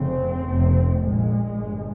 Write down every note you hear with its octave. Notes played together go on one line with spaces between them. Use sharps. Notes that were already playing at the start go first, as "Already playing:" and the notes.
Already playing: F1 F2 C#3 C4
F1 F2 C3
A#1 A#2 G#3
G1 G2